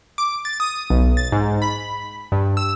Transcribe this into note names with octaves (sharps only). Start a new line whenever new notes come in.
D6
A6
D#6
B1
A6
G#2
B5
G2
E6